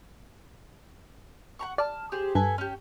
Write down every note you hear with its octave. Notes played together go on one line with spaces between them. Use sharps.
F#5 A#5 C#6
D5 A5 F6
G4 G#4 C5
G2 A4 B4 G#5
C#4 G4